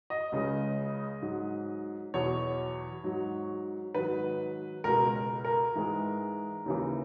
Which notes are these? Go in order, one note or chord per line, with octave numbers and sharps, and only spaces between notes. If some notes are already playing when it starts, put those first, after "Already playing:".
D#5
C#2 C#3 G#3
G#2 F#3
E2 B2 F#3 C#5
G#2 F#3
G#2 D#3 F#3 B4
C#2 B2 G#3 A#4
A#4
A#4
G#2 E3 G#3
D#2 C#3 E3